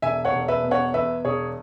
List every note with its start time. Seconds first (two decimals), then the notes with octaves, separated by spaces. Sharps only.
0.02 E1 E5 G#5
0.25 C#5 F#5
0.33 E1
0.48 B4 E5
0.63 B2
0.71 C#5 F#5
0.94 E2 B4 E5
1.25 E1 G#4 C#5